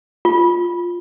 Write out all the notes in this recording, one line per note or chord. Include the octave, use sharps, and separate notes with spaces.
F4